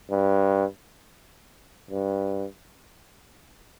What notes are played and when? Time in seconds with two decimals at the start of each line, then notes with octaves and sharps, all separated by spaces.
0.10 G2
1.91 G2